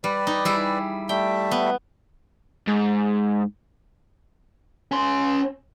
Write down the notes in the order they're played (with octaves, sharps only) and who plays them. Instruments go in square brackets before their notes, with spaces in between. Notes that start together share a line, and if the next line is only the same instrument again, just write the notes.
[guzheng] G3 [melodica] B4 D5
[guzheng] D#4
G3 E4 G#4
[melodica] G3 A3 E5 [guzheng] G5
[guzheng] B3
[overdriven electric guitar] G#2
[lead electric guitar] C#4 C6